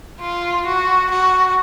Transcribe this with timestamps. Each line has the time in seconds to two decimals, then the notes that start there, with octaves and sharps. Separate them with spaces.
0.21 F4
0.66 F#4
1.11 F#4